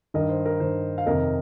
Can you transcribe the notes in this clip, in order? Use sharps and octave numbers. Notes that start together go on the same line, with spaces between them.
G2 D#3 A#4 D#5
C5
A#4
G2 D#3 C5
F5
F2 C3 D#3 A#4 D#5